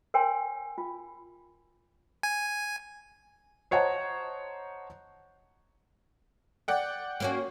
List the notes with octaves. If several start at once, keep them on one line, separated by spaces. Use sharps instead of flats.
A#4 C#5 G5 G#5 C6
F4
G#5
C5 C#5 D#5 F#5 A5 A#5
D5 F#5 G5
A#3 C#4 F#4